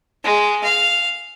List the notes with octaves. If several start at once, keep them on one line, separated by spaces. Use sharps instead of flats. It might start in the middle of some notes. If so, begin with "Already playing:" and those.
G#3
F5